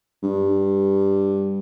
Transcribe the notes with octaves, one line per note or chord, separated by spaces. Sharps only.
G2